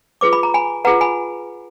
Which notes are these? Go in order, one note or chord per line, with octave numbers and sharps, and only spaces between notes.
F4 G#4 B4 D6
B5
A#5
G#5 B5
F4 G#4 B4 F#5 A#5
G#5 B5